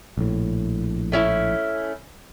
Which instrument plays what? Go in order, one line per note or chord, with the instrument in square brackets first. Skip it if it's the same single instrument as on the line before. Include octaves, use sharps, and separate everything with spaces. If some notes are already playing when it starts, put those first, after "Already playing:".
[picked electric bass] A#1 A2
[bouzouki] A3 C#4 E4